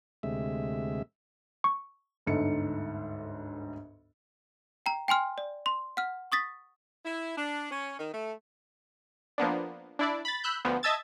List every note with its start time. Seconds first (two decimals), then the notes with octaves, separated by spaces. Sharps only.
0.23 D2 C3 G#3 E5
1.64 C#6
2.26 G1 D2 G#2 A4 C#7
4.86 G5 A#5
5.08 G5 G#5 C6 F6
5.38 D5
5.66 C6
5.97 F#5 F6
6.32 C#6 D#6 A6 B6
7.05 E4
7.36 D4
7.71 C#4
7.98 D#3
8.13 A3
9.38 F3 A#3 B3 D4
9.99 D4 E4 D5
10.25 B5 A6
10.44 B5 E6 F#6 G6
10.65 D2 F3 B3
10.83 D#5 E5 A5 E6 G#6 A6